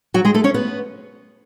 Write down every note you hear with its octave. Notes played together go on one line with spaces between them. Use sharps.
F#3 F#4
G#3 G#4
A3 A4
C#4 C#5
B3 B4